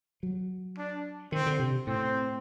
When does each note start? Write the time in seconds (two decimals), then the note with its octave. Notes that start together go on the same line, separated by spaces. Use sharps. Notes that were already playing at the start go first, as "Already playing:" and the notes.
0.23 F#3
0.78 D4
1.32 D#3 C4
1.46 D3
1.59 C3
1.87 A2 C4